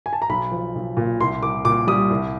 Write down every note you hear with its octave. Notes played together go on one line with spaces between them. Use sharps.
G#5
A5
A#5
B1 B5
F3
B1
A#2
C2 C6
C2 D6
A#2 D6
G3 D#6
C2